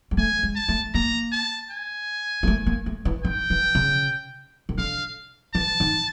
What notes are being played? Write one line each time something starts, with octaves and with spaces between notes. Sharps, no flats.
G#3
A3 G#5
G#3
A5
A3
A#3 A#5
A5
G#5
A#3
A3
A#3
A3
E3
D#3 G5
E3
C#3
D#3
D3 F5
E3 A5
D#3